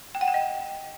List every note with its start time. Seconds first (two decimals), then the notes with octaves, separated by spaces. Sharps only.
0.15 G5
0.21 F#5
0.28 G5
0.34 D#5